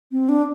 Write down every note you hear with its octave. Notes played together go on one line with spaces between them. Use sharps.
C4
D4